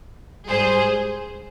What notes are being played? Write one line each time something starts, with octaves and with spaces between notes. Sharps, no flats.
G#2 G3 G#4 C5